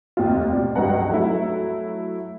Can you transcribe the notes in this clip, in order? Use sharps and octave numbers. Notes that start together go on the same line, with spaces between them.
F1 D#2 F4
B2 D5
C#2 G2 F#3 B4 F#5 A#5
F#3 A3 E4